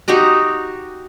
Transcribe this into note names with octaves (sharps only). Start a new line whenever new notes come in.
D#4 F#4 G4 A#5